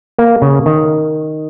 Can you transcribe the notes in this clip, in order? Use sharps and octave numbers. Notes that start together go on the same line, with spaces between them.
A#3
C#3
D#3